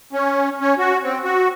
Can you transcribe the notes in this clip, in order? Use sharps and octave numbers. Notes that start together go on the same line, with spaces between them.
C#4
C#4
F#4
C4
F#4